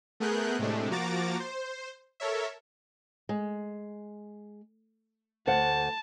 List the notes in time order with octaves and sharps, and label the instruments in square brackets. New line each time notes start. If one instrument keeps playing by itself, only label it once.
[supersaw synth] A3 B3 G#4 A#4 F#6 G6
A2 C3 G#3 A3 D4
F3 A#3 F#4 A#5 D6 A6
C5
A4 A#4 C#5 E5
[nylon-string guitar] G#3
[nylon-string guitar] D2 C5 F#5 [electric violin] A5